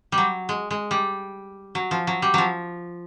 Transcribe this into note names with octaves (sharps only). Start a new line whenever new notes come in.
G3
F#3
G#3
G#3
G3
F#3
F3
F#3
G3
F3 F#3